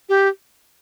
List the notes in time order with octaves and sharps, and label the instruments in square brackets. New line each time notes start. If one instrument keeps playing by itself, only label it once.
[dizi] G4